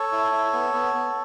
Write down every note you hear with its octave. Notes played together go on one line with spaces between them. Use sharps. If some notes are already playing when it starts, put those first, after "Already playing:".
Already playing: A4 C#5
E4
E4
B3
B3
B3